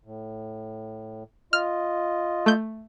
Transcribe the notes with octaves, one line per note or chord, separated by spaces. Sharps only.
A2
F4 D#5 F6
A3 G6